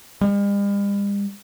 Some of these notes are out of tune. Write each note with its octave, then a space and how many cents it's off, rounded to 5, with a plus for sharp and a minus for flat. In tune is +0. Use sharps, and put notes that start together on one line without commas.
G3 +45